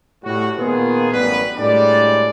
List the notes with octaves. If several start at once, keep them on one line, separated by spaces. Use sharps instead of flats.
A2 G3 F#4
A#2 D#3 A#3 B3 F4 G#4
A1 F#2 G3 B3 B4
A2 G3 G#3 D4 D5